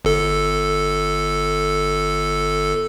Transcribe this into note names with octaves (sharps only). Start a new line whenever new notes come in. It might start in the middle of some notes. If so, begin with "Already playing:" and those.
G1 A4